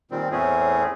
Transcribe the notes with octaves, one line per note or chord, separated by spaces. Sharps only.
A#2 D#3 G3 C4
E2 A2 A3 C4 C#4 G#4